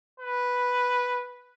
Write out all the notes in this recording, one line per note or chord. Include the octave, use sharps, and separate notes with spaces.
B4